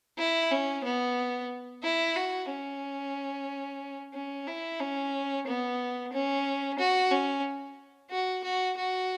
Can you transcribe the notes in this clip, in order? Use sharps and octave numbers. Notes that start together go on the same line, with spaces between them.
E4
C#4
B3
E4
F#4
C#4
C#4
E4
C#4
B3
C#4
F#4
C#4
F#4
F#4
F#4